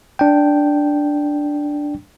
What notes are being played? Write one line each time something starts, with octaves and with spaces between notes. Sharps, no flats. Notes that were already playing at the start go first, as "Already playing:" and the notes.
D4 G5